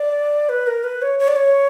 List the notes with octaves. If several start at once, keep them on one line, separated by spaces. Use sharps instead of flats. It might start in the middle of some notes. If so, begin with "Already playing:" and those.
Already playing: D5
B4
A#4
B4
C#5
C#5
D5
C#5